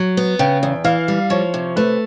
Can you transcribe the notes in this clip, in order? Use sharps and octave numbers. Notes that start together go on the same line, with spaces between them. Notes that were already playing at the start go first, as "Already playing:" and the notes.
Already playing: F#3
B3
C#3 G5
E2
E3 F5
G3
F3 C#5
C3
A3 B4